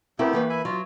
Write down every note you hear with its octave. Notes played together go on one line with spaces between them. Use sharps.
A3 B3 C4 E4 G4 A#4
E3 A#3 B4
E5 G#5 B5
F#3 F4